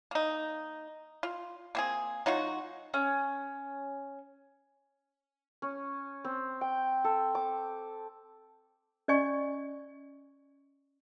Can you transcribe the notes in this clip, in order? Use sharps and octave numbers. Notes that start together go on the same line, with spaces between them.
A#3 D#4
F4
A#3 C4 G#4
F#3 D#4 F4 F#4
C#4
C#4
C4
G5
A4
D6
C#4 D5 D#5 G#5 C#6